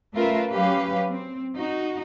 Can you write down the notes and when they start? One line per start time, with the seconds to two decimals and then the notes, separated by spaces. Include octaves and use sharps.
0.13 A3 C#4 F4 A#4 B4 E5
0.51 F#3 C#4 G4 B4 F5
1.07 C4
1.56 D#4 F#4